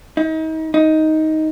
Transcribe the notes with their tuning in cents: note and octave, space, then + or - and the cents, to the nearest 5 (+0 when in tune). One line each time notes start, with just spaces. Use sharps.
D#4 +35
D#4 +10